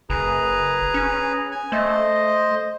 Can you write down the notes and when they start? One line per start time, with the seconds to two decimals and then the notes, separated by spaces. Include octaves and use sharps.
0.10 F#1 G#4 B4 A#5
0.94 C#4
1.52 G#5
1.72 A3 C5 D#5